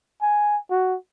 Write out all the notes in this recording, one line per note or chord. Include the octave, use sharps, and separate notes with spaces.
G#5
F#4